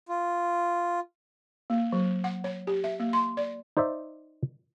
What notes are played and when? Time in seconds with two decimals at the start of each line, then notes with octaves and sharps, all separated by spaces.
0.09 F4
1.70 A#3
1.92 F#3
2.24 F#5
2.44 C#5
2.67 G4
2.84 E5
3.00 A#3
3.13 C6
3.37 D5
3.77 D#4 C5 D5 E5